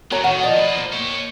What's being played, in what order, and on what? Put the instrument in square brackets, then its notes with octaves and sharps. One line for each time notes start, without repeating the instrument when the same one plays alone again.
[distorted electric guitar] C3 A3 [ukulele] F#4 C#5 A#5
[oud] A2 [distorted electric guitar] D#3 [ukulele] F#4 F#5
[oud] F3 F4 D#5 [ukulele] D5
[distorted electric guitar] A#3 B4
[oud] C5
[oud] A#3 [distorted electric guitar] C#5 G5